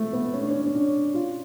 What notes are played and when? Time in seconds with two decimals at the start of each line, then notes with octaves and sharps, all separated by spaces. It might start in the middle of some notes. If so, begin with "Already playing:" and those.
Already playing: A3
0.13 B3
0.33 C#4
0.41 D4
0.51 C#4
0.66 C#4
0.74 D4
1.14 F4